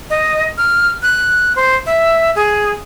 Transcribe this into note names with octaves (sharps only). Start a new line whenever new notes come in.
D#5
F6
F#6
C5
E5
G#4